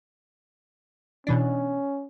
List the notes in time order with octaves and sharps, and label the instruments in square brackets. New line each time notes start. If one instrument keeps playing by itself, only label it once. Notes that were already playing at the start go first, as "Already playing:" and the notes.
[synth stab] B2 E3 D4 [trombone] C#4